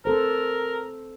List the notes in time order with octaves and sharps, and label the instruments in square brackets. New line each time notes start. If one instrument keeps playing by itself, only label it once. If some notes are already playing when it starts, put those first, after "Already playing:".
[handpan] C4 A4 C5 [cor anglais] A#4